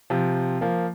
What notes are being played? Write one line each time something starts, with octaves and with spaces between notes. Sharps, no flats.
C3 F3
F3 A#3